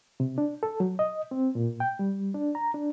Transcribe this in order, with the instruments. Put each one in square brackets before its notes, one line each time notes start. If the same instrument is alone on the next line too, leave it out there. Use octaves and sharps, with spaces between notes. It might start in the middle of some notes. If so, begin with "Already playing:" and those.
[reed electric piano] C3
D4
A4
F#3
D#5
C4
A#2
G5
G3
D4
A#5
D4